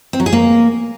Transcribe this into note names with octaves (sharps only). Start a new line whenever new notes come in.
C4
F#3
G#4
A#3